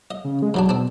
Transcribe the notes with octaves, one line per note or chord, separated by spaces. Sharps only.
D#5
C#3
G#3
E1 G#2 F#3 D4
B2 C4 D4